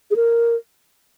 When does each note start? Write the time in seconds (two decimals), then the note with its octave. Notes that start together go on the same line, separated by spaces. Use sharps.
0.11 G#4
0.16 A#4